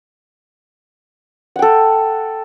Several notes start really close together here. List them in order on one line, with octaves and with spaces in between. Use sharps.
F#5 G5 A4